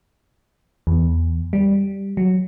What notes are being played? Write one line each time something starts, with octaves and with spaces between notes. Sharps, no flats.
E2
G3
F#3